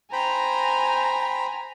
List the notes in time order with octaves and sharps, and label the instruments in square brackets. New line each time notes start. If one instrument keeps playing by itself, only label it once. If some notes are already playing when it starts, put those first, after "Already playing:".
[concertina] C5 G5 B5 [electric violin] G#5 A#5